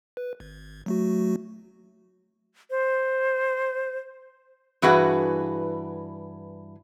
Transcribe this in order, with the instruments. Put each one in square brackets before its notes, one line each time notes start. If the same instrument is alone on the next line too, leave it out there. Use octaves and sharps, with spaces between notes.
[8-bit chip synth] B4
G#1
F#3 A3 F#4
[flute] C5
[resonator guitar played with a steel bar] G2 E3 F#4 G#4 B4 F#5